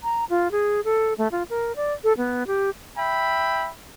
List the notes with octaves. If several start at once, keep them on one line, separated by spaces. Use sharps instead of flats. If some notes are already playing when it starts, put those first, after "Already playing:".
A#5
F4
G#4
A4
A3
F4
A#4
D5
A4
B3
G4
E5 G5 B5